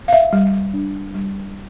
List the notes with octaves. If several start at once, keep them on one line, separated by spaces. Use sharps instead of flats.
F5
E5
G3
D4
G3